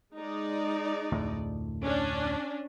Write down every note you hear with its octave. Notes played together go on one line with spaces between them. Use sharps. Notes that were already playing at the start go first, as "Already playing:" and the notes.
G#3 D#4 D5
F1 D2 A2
C#4 D4